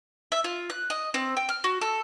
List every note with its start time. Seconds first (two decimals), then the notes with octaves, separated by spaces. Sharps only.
0.32 E5
0.44 F4
0.70 F#6
0.90 D#5
1.14 C4
1.37 G5
1.49 F6
1.64 F#4
1.81 A4